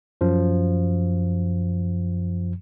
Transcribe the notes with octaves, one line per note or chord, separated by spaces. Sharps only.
F#2 F3